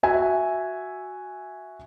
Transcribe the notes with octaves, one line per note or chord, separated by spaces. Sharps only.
F#4 E5 G#5